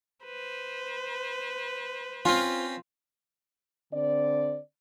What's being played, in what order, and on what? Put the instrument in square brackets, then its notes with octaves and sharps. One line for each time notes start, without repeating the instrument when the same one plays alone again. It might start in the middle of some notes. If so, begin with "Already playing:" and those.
[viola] B4 C5
[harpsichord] C4 C#4 [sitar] F4
[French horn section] D3 C4 D5